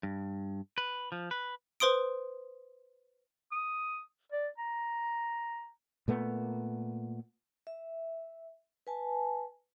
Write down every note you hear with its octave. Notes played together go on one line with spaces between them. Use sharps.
G2
B4
F3
B4
B4 C5 C6 D#6 D7
D#6
D5
A#5
A#2 A3 B3
E5
B4 G#5 A5